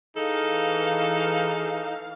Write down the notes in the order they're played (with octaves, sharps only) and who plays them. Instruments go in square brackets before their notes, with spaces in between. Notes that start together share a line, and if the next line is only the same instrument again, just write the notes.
[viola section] E3 F5 [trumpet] D#4 [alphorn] G#4 [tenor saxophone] A4